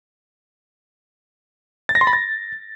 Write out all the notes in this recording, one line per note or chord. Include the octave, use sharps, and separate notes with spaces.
A6
A#6
C6
B5
A6